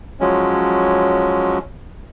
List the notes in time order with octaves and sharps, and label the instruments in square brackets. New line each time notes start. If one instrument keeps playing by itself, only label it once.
[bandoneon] F3 F#3 G#3 C#4